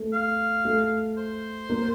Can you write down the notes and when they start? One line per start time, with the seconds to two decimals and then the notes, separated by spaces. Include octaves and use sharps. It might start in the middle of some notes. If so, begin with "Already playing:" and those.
Already playing: A3
0.13 F5
0.65 A3
1.17 C5
1.70 A#3